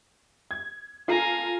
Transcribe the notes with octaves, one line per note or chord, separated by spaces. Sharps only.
G#6
F4 A4 G#5 A#5 C7